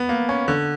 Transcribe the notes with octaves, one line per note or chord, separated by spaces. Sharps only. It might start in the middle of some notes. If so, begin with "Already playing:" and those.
Already playing: B3
A#3
C#4
D3